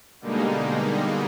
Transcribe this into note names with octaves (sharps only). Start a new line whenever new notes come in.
B2 D3 G3 G#3 A#3 D#4